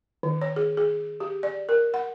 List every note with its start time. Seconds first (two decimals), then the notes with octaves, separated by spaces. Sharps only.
0.23 D#3
0.41 C#5
0.56 G#4
0.77 G#4
1.20 G4
1.43 D5
1.69 A#4
1.94 F#5